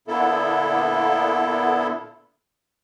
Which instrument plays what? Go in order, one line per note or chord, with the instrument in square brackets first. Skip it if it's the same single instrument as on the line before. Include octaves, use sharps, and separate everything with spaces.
[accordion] A#2 D3 A#3 B3 E4 A4